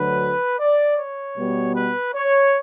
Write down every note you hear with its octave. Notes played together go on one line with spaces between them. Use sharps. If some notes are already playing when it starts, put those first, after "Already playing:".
Already playing: D2 D3 F#3 B4
D5
C#5
B2 G3 B3
B4
C#5